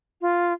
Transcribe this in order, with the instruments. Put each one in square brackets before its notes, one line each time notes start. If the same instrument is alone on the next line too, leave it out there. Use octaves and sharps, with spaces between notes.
[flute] F4